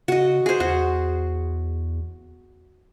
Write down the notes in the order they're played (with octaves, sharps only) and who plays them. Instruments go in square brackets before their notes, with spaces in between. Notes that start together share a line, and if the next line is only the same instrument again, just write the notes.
[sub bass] C#3 [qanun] F#4 D#5
[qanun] G#4 C5
[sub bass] E2 [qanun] F#4